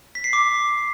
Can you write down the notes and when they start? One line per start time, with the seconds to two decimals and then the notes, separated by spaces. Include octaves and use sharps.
0.15 B6
0.24 C7
0.33 D6